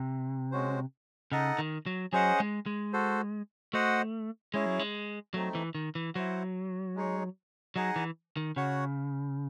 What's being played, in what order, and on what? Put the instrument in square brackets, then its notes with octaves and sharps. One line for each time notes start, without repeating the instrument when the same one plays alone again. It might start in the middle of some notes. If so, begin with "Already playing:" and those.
Already playing: [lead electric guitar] C3
[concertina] G#3 C#4 F#4 C5
[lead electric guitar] C#3 [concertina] D#4 A4 D#5 F#5
[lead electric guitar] D#3
F#3
[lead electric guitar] F#3 [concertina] C#4 G#4 C5 D#5 F#5
[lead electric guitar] G#3
G#3
[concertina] F#4 A4 C5
[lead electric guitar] A3 [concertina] F#4 C5 D#5 F#5
[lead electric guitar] G#3 [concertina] C#4 E4 G#4
[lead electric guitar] F#3
G#3
[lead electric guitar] F#3 [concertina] A3 C4 D#4
[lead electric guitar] E3
D#3
E3
[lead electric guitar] F#3 [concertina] E4 C5 F#5
[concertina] G#3 D#4 G#4 C#5
[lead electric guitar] F#3 [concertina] D#4 G#4 D#5 F#5
[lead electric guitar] E3
D#3
[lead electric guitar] C#3 [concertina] F#4 C#5 F#5